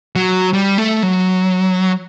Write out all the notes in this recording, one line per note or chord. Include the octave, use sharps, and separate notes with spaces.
F#3
G3
A3
F#3